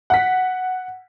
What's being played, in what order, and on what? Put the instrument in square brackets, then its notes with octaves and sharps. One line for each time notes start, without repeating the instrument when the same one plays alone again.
[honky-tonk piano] F#5 B6